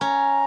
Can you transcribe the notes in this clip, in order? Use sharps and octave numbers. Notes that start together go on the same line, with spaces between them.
C#4 A#5